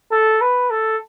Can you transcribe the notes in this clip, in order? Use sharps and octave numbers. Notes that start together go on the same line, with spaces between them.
A4
B4
A4